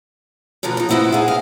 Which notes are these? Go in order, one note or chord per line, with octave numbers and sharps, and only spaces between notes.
B2 D3 F3 F#3 A3
A#2 D#4
B3 D#4 E4 C5 F#5
G#4 F5
F5